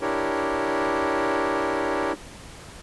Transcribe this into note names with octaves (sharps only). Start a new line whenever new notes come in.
D4 E4 G4 A#4 C#5